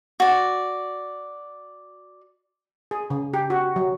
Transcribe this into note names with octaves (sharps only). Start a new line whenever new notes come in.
F#4 D5
G#4
C#3
G4
F#4
F#3